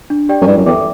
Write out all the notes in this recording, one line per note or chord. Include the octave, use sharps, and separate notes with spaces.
D4
G4 D5 G5
F#2
G2 E4
F#2
E2 A4 E5 G5 D6